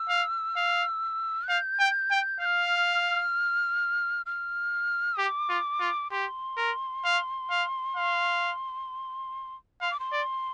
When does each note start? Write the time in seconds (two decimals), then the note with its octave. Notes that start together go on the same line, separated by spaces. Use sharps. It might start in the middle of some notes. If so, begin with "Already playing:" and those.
Already playing: E6
0.09 F5
0.56 F5
1.48 F5 G6
1.79 G5
2.11 G5
2.41 F5 G6
2.45 F6
4.26 F6
5.18 G4 D6
5.49 F4
5.80 F4
6.11 G4 C6
6.57 A#4
7.05 F5
7.50 F5
7.96 F5
9.81 F5 C6
9.91 D6
10.00 C6
10.12 D5